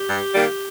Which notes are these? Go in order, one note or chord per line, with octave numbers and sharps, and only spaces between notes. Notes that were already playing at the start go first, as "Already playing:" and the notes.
Already playing: G4
G2
D#3 G3 A#3